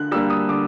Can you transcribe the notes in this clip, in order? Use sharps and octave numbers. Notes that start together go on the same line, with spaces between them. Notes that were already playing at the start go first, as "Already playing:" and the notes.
Already playing: D3 F#6
G3 A#3 D4 E6
D#6
D3 D6